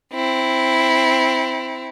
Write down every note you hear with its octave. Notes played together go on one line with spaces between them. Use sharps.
C4 E4